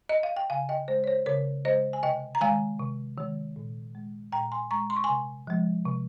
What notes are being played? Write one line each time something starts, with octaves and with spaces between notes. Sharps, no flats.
D#5
F5
G5
C#3 F5 G#5
D#5 G5
G#3 C5
C#5
C5
C#3 A#4 C#5
G#3 C5 D#5
G#5
C3 D#5 G5
A#5
D#3 G#3 F5 G#5
C3
D#3 G#3
A#2
G#3
A#2 G5 A#5
G#5 C6
G#3 A#5 C#6
C6
C#6
G#5 C6
C3
F3 G#3
C3